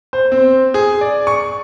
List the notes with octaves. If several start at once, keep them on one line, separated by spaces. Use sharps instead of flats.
C5
C4
G#4
D5
C#6